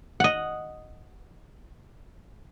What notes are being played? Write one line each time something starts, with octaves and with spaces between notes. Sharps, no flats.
D#5 F#5